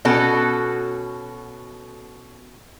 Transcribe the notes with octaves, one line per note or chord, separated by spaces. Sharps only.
B2 C#4 F#4 A4